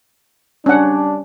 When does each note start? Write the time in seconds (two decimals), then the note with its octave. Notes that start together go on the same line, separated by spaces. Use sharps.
0.66 G3 C#4 D4 F#5